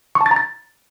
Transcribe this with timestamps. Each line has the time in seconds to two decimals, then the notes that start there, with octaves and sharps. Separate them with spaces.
0.15 C#6
0.21 A5
0.26 A6
0.31 A#5
0.36 A6